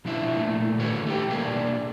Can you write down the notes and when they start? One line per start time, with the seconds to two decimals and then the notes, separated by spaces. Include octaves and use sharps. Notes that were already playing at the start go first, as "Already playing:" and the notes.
0.05 B2 F3 D4 E4 C5 E5
0.37 A#2 A3
0.79 D3 D#3 F#4 A4 B4 C#5
1.06 A3 G4 G5
1.28 B2 G3 A#3 D4 G#4 A#4